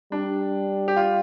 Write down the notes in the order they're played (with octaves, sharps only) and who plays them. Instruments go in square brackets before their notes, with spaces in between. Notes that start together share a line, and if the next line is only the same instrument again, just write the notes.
[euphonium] G3 [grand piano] D4
[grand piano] G4
F4